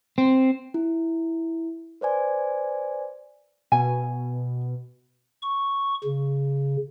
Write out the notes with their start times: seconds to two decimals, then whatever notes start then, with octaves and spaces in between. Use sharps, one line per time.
0.18 C4
0.74 E4
2.01 B4 C5 D5 G#5
3.72 B2 G#5
5.42 C#6
6.04 C#3